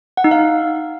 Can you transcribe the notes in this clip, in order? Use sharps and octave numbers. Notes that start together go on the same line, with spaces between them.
F#5
D#4
F5